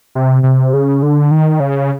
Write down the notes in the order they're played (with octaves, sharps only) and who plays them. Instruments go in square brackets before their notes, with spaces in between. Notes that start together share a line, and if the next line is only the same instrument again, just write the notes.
[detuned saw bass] C3
C3
C#3
D3
D#3
C#3